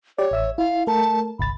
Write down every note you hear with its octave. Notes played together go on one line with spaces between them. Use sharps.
G4 C#5 D5
A1 E5 E6
E4 F5
A3 A#4 A5
G1 C2 B5 A6